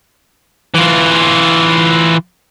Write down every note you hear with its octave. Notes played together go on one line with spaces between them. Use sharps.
E3 F4